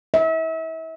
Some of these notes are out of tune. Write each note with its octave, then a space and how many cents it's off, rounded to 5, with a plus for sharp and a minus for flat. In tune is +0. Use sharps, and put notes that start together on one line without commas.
E5 -35